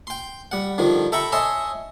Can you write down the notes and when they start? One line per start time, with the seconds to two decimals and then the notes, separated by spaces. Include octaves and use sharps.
0.07 G5 C6
0.51 G3 F#5
0.78 D3 D#3 F3 G3
1.12 A4 E5 G5 A#5 B5 C#6
1.32 C#5 D#5 E5 G#5 A5 C6